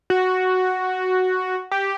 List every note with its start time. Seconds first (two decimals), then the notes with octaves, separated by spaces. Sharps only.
0.10 F#4
1.72 G4